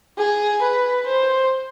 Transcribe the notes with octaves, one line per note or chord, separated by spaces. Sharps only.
G#4
B4
C5